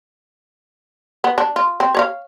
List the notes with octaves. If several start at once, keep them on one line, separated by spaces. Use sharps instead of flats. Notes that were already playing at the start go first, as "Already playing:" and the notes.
B3
D4
F4
C4
C#5 D5 F5